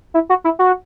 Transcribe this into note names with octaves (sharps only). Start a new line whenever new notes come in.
E4
F#4
E4
F#4